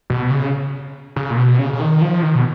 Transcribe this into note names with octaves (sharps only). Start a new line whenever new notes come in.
B2
C#3
C#3
A#2
B2
C#3
C#3
D#3
F3
D#3
B2